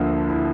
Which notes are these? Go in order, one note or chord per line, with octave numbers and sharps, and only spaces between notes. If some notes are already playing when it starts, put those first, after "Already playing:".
Already playing: D2 D3 F3 A#3
E4